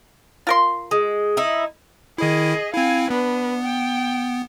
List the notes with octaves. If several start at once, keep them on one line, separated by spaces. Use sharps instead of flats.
F4 A#4 C6
G#3
D#4 E4
D#3 E4 G#4 D#5
C4 E4 F5 G#5
B3 D4 B4
G5